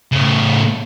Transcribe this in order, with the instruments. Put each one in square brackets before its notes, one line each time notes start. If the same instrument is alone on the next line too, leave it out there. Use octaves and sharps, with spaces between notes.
[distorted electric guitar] A2 C#3